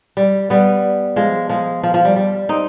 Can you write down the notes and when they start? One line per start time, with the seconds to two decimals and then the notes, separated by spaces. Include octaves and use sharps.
0.17 G3
0.50 G3 B3
1.16 F3 G#3
1.49 F3 G#3
1.83 F3
1.94 F3
2.05 G3
2.16 G3
2.49 C4 D#4